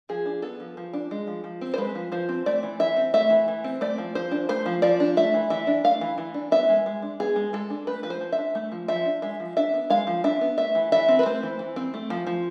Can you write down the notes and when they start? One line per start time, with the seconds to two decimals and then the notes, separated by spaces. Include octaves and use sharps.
0.09 F3 G#4
0.26 D4
0.42 B3 A4
0.60 F3
0.77 F3
0.93 D4
1.11 G#3
1.27 F3
1.44 F3
1.61 C4
1.74 C5
1.78 G#3 B4
1.95 F3
2.12 F3 C5
2.29 C4
2.46 A3 D5
2.63 E3
2.80 E3 E5
2.96 C4
3.14 A3 E5
3.30 E3
3.48 E3
3.64 C4
3.81 A3 D5
3.98 F3
4.15 F3 C5
4.31 D4
4.49 A3 C5
4.66 F3
4.82 F3 D5
5.00 D4
5.17 A3 E5
5.34 E3
5.50 E3 E5
5.67 D4
5.84 A3 F5
6.01 E3
6.18 E3
6.34 D4
6.52 B3 E5
6.69 G#3
6.86 G#3
7.02 D4
7.20 B3 G#4
7.36 G#3
7.53 G#3 A4
7.70 D4
7.87 A3 B4
8.03 F3 B4
8.10 C5
8.21 F3
8.33 E5
8.38 D4
8.55 A3
8.72 F3
8.88 F3 E5
9.06 D4
9.22 G#3 E5
9.40 F3
9.57 D4 E5
9.74 B3
9.90 G#3 F5
10.07 F3
10.24 D4 E5
10.41 B3
10.58 A3 E5
10.75 E3
10.92 E3 E5
11.09 C4
11.19 B4
11.26 A3 C5
11.43 E3
11.59 E3
11.76 C4
11.94 A3
12.10 F3
12.27 F3